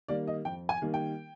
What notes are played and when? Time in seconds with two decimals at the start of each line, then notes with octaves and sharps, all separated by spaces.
0.08 D#3 G3 A#3 D5
0.27 D#5
0.45 F2 G5
0.69 G#5
0.82 D#3 G3 A#3
0.94 G5